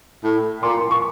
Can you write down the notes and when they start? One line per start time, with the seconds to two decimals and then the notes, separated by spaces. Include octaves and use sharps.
0.24 A2
0.63 A#2 C6 D6
0.77 C6
0.91 C#6